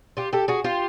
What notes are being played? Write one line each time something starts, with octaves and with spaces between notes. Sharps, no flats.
F4 G4
G4 A4
F#4 G#4
F4 G4